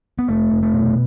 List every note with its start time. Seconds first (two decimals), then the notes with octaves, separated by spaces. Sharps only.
0.19 B3
0.28 F1 A3
0.51 F1
0.63 A3
0.74 B2